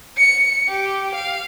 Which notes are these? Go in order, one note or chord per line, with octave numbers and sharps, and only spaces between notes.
C#7
G4
F5